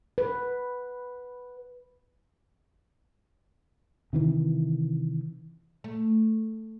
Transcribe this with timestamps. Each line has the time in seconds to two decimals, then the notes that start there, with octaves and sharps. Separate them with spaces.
0.18 B4
4.13 C3 D#3 E3
5.84 A3